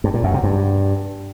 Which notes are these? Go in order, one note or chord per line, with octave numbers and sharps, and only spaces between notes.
G2
A#2
F#2
C3
G2